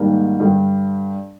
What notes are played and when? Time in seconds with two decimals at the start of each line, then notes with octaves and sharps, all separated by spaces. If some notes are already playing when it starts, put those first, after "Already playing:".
Already playing: G#2 D#3 G3 A#3 D4
0.40 G2 D3 G3